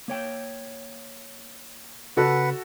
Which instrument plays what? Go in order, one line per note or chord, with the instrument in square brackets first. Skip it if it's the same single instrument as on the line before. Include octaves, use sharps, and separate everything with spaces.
[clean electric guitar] A#3 C#5 G5
[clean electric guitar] C#3 [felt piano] F#4 A4 [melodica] B4 F#5